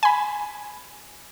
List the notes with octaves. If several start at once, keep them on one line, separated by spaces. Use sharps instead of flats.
G#5 B5